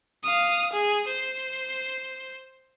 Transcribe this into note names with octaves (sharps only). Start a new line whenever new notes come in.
F5 D#6
G#4
C5